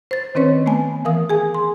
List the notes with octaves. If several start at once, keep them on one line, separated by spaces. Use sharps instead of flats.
C5 A6
D#3 C4 C#4 B4 C#5
A3 B3 G#5
E3 A#4 F5 D#6
G#4 G#5
C6